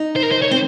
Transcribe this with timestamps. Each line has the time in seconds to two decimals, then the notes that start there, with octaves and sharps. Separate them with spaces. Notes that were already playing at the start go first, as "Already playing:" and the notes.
Already playing: D#4
0.16 C5
0.22 A#4
0.31 C5
0.42 C#5
0.51 C4 C5